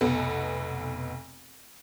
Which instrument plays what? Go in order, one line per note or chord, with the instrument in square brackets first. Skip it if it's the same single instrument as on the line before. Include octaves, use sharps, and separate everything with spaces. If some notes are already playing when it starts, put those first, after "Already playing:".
[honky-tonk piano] F1 B1 B3 A4